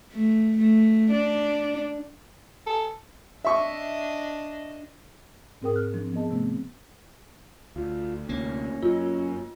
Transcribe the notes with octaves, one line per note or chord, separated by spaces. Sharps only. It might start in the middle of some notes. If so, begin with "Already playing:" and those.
A3
A3
D4
A4
D4 D#5 E5 C#6
G#2 C4 G#4 A#4 G5 D#6
F6 F#6
F3 C4 D4
F3 B3 G#4 D#5 A5
C3 A3 B3 C4
D2 F4
D2 C3 A#3 C#4
F#2 F4